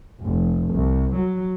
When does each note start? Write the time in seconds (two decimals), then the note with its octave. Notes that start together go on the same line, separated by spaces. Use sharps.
0.22 F1
0.70 C2
1.13 F#3